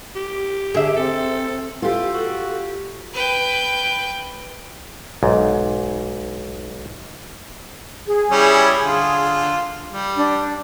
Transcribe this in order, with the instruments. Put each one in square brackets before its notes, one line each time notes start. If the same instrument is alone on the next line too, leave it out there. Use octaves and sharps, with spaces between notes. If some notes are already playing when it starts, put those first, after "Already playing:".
[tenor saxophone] G4
[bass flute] D3 [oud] G#4 E5
[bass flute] C4 [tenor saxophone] A4
[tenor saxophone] E3 [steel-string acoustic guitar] F4 G4 [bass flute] A4
[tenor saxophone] F#4
[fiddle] B4 G5
[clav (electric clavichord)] B1 G#2
[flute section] G#4
[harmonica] G3 C#4 E4
D3 F4
G3
[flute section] D4